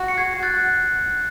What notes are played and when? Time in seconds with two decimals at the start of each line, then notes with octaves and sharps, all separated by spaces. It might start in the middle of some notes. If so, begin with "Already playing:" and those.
Already playing: F#4
0.08 C#7
0.18 G#6 C7
0.43 F#6 A6